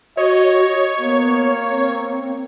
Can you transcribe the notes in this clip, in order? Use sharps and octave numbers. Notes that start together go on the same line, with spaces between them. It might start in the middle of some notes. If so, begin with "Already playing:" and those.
F#4 C#5 D#5
A#3 B3
C4